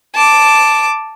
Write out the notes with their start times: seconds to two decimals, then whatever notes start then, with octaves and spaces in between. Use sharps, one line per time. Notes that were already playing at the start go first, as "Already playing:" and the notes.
0.15 A5 D6